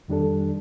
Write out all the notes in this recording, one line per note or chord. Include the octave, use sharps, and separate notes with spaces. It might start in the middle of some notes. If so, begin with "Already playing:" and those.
F2 D#3 G3 D4 A4